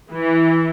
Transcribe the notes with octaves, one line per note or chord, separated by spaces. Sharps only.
E3